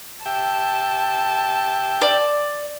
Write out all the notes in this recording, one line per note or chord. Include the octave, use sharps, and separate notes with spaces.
G4 E5 G5 A5
D5